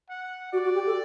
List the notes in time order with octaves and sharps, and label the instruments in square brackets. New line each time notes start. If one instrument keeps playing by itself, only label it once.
[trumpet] F#5
[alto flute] F#4 [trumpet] D5
[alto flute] F#4
G4
A4